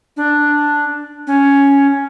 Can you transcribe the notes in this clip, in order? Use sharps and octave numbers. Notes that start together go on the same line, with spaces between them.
D4
C#4